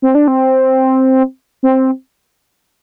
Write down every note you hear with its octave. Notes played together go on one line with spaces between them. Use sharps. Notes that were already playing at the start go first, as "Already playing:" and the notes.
C4
D4
C4
C4